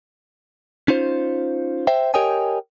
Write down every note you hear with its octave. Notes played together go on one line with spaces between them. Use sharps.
C#4 D#4 F4 C5
C5 E5 G5
G4 A#4 C#5 D#5 G5 G#5